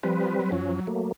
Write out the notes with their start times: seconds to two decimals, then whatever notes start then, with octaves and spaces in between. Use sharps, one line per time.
0.03 F3 G3 C4 B4
0.39 F#3
0.52 F#2 F3 C#4
0.87 F#3 A3 A#3